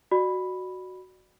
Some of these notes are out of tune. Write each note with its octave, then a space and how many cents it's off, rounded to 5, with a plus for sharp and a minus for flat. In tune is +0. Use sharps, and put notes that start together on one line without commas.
F#4 +0 D5 +35 B5 +0